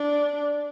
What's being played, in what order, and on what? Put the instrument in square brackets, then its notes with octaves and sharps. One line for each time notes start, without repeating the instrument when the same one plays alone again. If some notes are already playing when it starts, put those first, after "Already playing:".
Already playing: [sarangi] D4